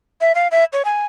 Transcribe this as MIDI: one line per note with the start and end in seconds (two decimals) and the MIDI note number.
0.21 0.32 76
0.35 0.48 77
0.51 0.64 76
0.73 0.82 73
0.85 1.06 80